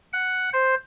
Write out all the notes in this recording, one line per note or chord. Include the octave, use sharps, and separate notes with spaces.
F#5
C5